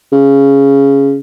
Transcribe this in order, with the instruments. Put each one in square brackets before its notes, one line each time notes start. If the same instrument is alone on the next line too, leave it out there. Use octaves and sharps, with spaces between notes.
[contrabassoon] C#3